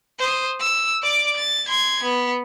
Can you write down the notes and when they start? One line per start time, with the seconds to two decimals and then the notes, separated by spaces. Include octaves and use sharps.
0.19 C5 D#6
0.60 E6
1.03 D5 D6
1.37 A6
1.68 C6 G#6
2.03 B3